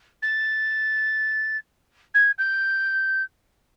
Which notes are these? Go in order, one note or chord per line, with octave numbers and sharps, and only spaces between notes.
A6
G#6
G6